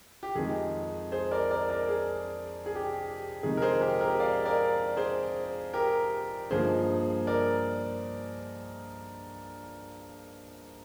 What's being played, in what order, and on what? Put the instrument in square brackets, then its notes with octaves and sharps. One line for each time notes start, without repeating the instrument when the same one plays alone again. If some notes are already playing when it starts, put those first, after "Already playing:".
[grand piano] G4
F2 D#3 G#3 G#4
G#4 C5
A#4 D5
A#4 D5
A#4 D5
G#4
G#4
G4
G4
F2 C3 D#3 G#3 D#4 G#4
A#4
G#4 C5
G4 A#4
G4 A#4
D5 F5
A#4 D5
G#4 C5
G4 A#4
G2 F3 A#3 D#4 G#4 C5
A#4 D5